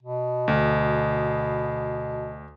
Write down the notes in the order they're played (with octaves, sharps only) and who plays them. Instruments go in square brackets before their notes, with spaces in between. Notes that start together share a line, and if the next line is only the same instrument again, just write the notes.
[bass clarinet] B2
[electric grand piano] D2